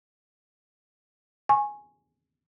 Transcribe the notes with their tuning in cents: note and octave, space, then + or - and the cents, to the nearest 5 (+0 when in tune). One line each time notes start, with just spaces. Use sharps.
G#5 +0 C#6 -25